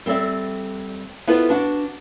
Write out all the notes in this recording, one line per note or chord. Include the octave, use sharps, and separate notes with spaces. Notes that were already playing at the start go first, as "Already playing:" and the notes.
G3 C4 A4 D5 E5
B3 E4 F4 A4 B4 C5
D4 F#4 F#5